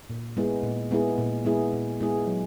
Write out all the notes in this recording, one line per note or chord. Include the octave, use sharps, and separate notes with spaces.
A#2
G#3 B3 E4 G#4
A#2
G#3 B3 E4 G#4
A#2
G#3 B3 E4 G#4
A#2
G#3 B3 E4 G#4
F#3